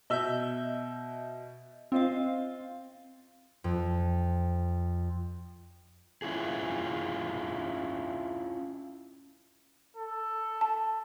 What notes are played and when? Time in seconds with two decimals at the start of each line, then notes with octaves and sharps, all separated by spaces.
0.10 B2 D#5 E5 E6 G6
1.92 C4 F4 C5 D#5 F5
3.64 F2
6.22 C#4 E4 F4 G#4
9.97 A4
10.61 A5